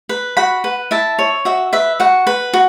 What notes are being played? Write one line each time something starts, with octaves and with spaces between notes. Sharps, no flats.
B4
F#4 F#5 B5
B4
E4 E5 A5
C#5
F#4 E5
B4 E5
F#4 F#5
B4
F#4